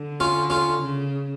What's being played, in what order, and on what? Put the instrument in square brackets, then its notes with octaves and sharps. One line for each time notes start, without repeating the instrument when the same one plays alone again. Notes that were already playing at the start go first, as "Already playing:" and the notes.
Already playing: [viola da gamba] D3
[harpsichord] C#4 F4
C#4 F4
[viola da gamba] C#3